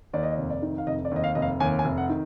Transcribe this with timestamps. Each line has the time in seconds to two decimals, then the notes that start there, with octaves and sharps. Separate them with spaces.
0.14 D#2 D5
0.23 D#5
0.32 D5
0.38 F1
0.50 D5
0.62 D#3
0.78 F5
0.87 F1 D#5
1.05 D5
1.11 D#2 D#5
1.24 F5
1.35 F1 D#5
1.42 F5
1.60 D#2 G#5
1.79 G#5
1.85 F1
1.98 F#5
2.09 D#3